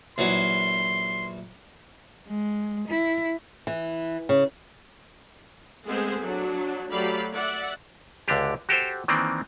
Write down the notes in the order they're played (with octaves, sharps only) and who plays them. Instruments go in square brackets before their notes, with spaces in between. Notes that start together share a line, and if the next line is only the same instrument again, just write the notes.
[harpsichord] A#1 E3 F#3 [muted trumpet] C6
[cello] G#3
E4
[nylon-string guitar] E3
C#3
[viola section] G#3 A3 B3 C4 G#4 C5
F#3 D4
F#3 A3 G4 D5 F5 B5
D5 E5 F#5
[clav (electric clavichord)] C#2 D3 D4 G4
F#4 G4 A4 C5
D#3 E3 A#3 C4 D4